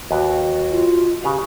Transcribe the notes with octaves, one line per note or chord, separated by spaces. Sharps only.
D#2 F#4 B4
F4
C#3 G4 B4 F5